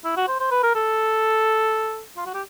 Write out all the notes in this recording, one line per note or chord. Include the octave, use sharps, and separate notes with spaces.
E4
F#4
C5
C5
B4
A#4
A4
F4
F#4
G4